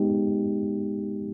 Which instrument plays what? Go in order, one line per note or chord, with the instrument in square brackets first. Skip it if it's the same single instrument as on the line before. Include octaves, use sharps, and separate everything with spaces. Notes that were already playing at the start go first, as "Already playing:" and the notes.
Already playing: [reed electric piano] G#3 B3 D#4 G4